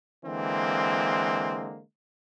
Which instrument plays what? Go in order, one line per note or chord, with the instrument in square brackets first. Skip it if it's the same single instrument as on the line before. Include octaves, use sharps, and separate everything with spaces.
[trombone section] D3 E3 G#3 A#3 C4